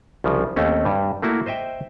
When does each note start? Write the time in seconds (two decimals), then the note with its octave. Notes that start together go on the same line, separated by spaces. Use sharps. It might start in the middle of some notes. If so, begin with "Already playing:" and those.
0.24 C2 C#3 F3
0.56 D#2 A3 C4 C#4
0.85 G2 G3
1.22 A3 A#3 E4 F#4
1.46 C5 D#5 E5 G5